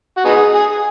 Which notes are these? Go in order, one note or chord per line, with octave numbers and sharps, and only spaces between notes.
F#4
B3 D#4 G#4
G#4